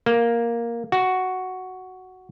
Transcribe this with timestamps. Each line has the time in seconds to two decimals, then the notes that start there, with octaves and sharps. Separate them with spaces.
0.06 A#3
0.92 F#4